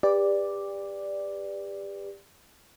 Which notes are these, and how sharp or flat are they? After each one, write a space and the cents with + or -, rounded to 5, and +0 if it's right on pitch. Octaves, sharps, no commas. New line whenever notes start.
G4 +30 B4 +0 D5 +0